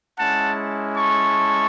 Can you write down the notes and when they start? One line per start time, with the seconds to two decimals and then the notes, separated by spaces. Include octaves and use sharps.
0.18 G#3 C#4 E4 F#5 A5
0.95 A5 C#6